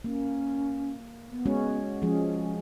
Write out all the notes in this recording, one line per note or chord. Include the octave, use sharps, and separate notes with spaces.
A#3 C#4
B3
G#3 C#4 F#4
F3 G#3 C#4 G#4